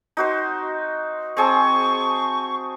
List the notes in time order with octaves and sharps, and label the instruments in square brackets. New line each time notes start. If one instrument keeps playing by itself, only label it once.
[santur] D#4 F#4 C5
[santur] C4 G#4 A5 [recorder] C#6